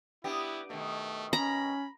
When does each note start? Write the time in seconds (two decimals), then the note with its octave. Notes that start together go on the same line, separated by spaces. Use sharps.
0.24 B3 D4 E4 G4
0.70 B2 D#3 A3
1.33 C#4 A#5 B5